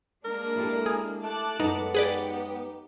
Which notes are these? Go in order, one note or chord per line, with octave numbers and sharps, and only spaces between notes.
G#3 A#3 D4 A#4
E4 G4 A4
G#4
A3 A5 D6 F#6
F#2 G#3 B3 D#4 A4
D#4 G4 G#4 B4 D5